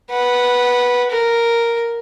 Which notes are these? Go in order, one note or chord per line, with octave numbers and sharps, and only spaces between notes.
B4 F#5
A#4